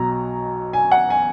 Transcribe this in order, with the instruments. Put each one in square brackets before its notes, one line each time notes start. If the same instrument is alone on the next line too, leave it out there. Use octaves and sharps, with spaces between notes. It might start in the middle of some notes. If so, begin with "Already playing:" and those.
Already playing: [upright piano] B1 B2 F#3 A#5
G#5
F#5
G#5